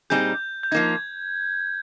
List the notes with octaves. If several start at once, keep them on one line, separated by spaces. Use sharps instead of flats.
A#2 G3 C4 D#4 G#4 G6
G6
F3 A#3 D#4 G#6